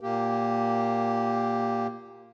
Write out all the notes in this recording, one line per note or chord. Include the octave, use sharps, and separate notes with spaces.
A#2 A#3 G4